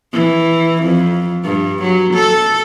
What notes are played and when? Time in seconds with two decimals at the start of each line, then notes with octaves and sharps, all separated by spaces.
0.13 E3
0.83 F2
1.44 G2
1.82 F#3
2.14 A4